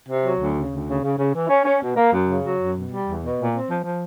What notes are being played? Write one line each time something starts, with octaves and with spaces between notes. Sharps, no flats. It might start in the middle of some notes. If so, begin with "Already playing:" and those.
C3
F#3
D2
C#3
D2
C#3
C#3
C#3
E3
C#4
C#4
B2
A#3
F#2
C#3
F#3
F#2
B2
G3
E2
B2
A#2
C4
F3
F3